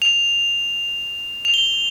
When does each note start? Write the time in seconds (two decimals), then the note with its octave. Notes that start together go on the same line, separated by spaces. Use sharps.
0.02 F7
1.45 F7
1.54 G7